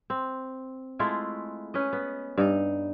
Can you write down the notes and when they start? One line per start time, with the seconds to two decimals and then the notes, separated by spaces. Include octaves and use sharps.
0.10 C4
0.99 G#3 A3 E4 F4
1.74 C#4 B4 D#5
1.93 B3
2.38 G2 D#4